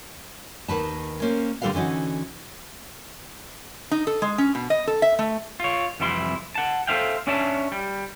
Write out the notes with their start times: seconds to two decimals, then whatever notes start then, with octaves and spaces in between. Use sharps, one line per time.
0.68 D#2 D#3 B4 A5
1.22 A#3 C#4 C5
1.62 A#2 D3 G3 A4 B4 F5
1.74 D3 E3 C#4 D#4 F#4
3.91 D#4
4.07 A4
4.22 G#3
4.38 C#4
4.55 B2
4.70 D#5
4.87 A4
5.02 E5
5.19 A3
5.60 F4 C#5
6.00 C2 F2 E3 E4 C6
6.55 F#5 A5
6.87 A4 C5 E5 F5 G5
7.27 C#4 D4 C#5 E5 A5
7.72 G3